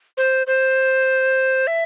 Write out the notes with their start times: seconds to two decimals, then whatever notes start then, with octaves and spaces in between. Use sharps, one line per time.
0.17 C5
0.47 C5
1.67 E5